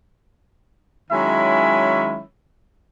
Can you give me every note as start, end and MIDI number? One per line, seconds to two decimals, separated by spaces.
1.11 2.21 51
1.11 2.21 54
1.11 2.21 56
1.11 2.21 61
1.11 2.21 64
1.11 2.21 76